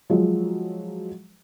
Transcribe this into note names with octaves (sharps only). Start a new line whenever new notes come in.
F3 F#3 G#3